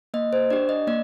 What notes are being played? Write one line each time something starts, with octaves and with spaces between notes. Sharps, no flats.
A#3 D#5
C5
D4 G4 D5
D#5
A#3 D5